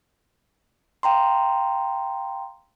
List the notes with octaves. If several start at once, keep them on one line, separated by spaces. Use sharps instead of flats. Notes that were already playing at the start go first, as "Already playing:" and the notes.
F5 G5 A#5 C6